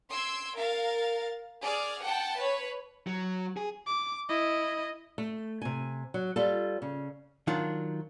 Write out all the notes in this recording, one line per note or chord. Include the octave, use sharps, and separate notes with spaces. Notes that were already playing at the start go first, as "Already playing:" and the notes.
C6 E6 G#6 D7
A#4 F5 A6
G#4 D5 F6
F#5 G5 A5
B4 C#5
F#3
G#4
D6
E4 D#5
A3
C3 G#5
F#3
G3 F4 A4
C#3
D#3 F#3 D4 F4